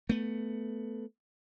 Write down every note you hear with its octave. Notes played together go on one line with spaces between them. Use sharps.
A3 B3